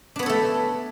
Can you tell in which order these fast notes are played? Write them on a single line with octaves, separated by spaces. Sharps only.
D4 B3 C#5 A4 A3